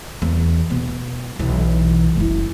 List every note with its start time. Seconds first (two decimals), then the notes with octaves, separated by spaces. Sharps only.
0.22 E2
0.70 B2
1.39 B1 E3
2.16 F#1 E4